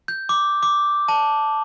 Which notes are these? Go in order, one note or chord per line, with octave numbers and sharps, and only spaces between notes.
G6
D6
D6
A5